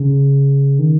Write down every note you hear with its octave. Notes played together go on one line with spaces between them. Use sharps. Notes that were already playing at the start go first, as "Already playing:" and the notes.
Already playing: C#3
D#3